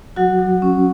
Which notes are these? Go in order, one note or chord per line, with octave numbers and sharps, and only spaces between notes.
F#3 F#4 F#5
F#3
C#4